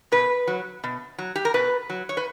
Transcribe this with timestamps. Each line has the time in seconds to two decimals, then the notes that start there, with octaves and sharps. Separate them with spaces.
0.12 B2 B4
0.47 F#3
0.84 B2
1.18 F#3
1.35 G4
1.45 A#4
1.54 B2 B4
1.90 F#3
2.09 C#5
2.17 B4